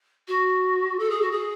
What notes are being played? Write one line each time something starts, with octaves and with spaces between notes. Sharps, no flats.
F#4
A4
G#4
F#4
G#4